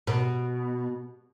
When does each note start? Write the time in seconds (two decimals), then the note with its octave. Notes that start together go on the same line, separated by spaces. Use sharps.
0.07 B2